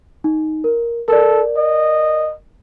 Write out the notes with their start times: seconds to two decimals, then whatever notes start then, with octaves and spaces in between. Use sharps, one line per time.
0.24 D#4
0.64 A#4
1.08 A4 A#4 D5
1.57 D#5